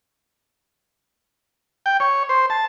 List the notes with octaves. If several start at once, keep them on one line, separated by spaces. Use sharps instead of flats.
G5
C#5
C5
A5